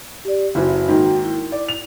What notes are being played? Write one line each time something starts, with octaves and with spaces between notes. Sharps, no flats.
G4 D5
F#1 E3 F#4
G#2 D#3 A#3 F#4 G5
E4
D5
F7